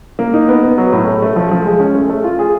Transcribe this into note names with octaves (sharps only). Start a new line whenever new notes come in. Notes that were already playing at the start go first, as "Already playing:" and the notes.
A#3
D#4
B3
B3
F#3
A2
A3
A3
F3
F3
G#3
C#4
A3
A3
F4
G#4